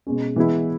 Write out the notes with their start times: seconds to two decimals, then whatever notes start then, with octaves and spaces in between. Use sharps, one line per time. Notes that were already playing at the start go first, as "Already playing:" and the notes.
0.07 B2 G#3 C#4
0.36 E3 G#3 B3 E4